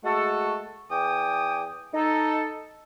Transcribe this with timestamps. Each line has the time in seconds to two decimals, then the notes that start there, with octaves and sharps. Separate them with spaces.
0.05 G#3 A3 F#4 A4
0.91 E2 G5 G#5 D6 D#6
1.94 D#4 A4